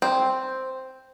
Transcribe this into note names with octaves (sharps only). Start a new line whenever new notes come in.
C4